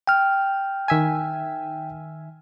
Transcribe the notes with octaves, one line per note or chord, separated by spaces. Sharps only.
G5 F6
D#3 E5 G#5